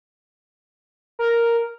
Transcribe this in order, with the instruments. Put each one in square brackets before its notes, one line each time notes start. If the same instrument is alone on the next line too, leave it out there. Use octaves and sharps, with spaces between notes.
[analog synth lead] A#4